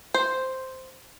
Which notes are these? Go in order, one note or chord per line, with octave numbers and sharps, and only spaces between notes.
C5